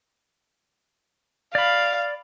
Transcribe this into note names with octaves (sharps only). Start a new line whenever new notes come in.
D5 F5 B5